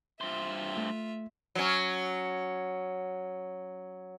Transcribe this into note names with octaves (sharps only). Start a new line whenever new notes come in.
G2 F4 C5 E5
A3
F#3 C#4